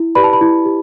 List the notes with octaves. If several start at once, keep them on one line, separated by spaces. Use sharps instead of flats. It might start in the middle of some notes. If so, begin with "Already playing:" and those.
Already playing: E4
G4 B4 D5 B5
A5
B5
E4
G4